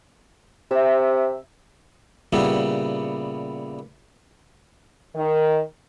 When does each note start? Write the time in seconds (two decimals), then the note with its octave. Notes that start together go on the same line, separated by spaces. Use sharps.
0.71 C3 E5
2.33 A#2 C#3 G3 B3 E4
5.15 D#3